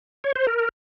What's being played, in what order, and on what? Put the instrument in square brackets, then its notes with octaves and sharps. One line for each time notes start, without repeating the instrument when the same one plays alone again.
[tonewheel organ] C#5
C5
A#4